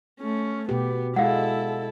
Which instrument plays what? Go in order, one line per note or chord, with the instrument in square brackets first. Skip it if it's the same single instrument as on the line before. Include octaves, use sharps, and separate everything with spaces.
[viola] A3 C#4
[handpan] B2 G4 [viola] B3
[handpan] G#3 [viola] E4 A4 [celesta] F5 F#5